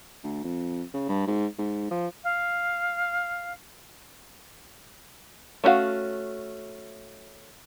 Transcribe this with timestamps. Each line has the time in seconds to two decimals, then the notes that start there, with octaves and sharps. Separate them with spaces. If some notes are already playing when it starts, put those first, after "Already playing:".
0.24 D2
0.44 F2
0.94 C#3
1.09 G2
1.27 G#2
1.58 G#2
1.91 F3
2.23 F5
5.64 A3 C#4 D4 F#4 F5